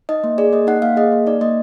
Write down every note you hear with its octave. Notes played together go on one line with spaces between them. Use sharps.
D#4 D#5
A#3
G#4 D5
A#3 D#5
D#4 F#5
A#3 F5
G#4 D#5
A#3
D#4 D5
A#3 D#5